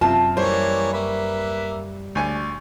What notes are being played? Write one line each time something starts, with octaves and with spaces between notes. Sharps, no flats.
F#2 C3 F4 A5
E3 G3 A#3 C5 C#5
A#3 B4 E5
D2 D5 G#5 C#6